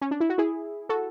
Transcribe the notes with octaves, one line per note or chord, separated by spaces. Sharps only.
C#4
D4
E4
F#4
E4 G#4
F#4 A4